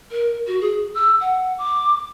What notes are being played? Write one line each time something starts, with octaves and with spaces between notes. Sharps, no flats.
A#4
F#4
G#4
E6
F#5
D6